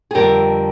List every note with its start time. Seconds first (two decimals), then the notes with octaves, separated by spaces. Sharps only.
0.11 G#4
0.15 F2 D3 G3 C4 G4 A#4